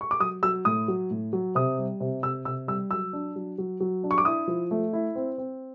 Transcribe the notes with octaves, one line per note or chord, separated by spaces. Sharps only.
C#6
D6
F#3 D#6
F#3 E6
A2 D#6
F#3
A2
F#3
C3 D#6
G3
C3
C3 E6
C3 E6
G3 E6
F#3 E6
D4
F#3
F#3
F#3
D4
C#6
D6
E4 D#6
F3
A3
E4
C4
C4